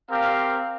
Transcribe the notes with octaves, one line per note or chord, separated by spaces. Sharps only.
C4 G4 A#4 F5